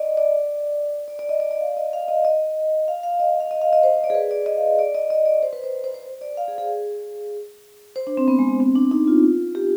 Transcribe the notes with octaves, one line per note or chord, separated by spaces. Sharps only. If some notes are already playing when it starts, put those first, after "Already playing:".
Already playing: D5 D#5
D5
D5
D5
D#5
D5
D5
F5
D#5
F5
D#5
D#5
F5
F5
D#5
F5
F5
D#5
F5
D#5
C5
C5
D5
G#4
B4
D5
D#5
F5
D5
D#5
D#5
D5
C5
B4
C5
C5
C5
D5
F5
G#4
G#4
C5
D4
C4
B3
G#3
B3
C4
D4
D#4
F4
G4